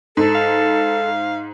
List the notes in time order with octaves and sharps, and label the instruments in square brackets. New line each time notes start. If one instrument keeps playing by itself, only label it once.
[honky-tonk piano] G#2 [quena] A4
[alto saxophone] F5